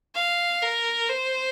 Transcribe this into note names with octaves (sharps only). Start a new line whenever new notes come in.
F5
A#4
C5